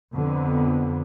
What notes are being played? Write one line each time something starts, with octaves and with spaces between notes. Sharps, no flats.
F2 D3 B3